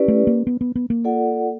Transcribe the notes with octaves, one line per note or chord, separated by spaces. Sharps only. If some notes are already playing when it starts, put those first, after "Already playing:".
Already playing: C#4 E4 G4 B4 D5
A3
A#3
B3
B3
B3
A#3
F4 A4 D5 F#5